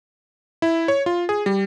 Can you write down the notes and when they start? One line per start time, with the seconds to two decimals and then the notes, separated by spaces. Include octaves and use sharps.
0.62 E4
0.88 C#5
1.06 F4
1.29 G#4
1.46 G3